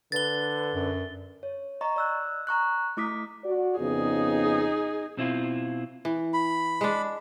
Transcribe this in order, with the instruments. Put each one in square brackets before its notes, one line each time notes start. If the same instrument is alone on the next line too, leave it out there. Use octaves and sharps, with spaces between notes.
[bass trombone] D3 [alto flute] B4 [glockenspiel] A6 G7
[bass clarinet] F#2
[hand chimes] C#5
D#5 A#5 C#6
D5 E6 F#6
A#5 C#6 F#6
A3 E4 D6 D#6 B6
[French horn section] F#4 D5
[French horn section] F2 C#3 B3 [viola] D#4 G#4
[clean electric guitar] B2 C4 E4 F4
[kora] E3
[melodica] B5
[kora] G#3 D4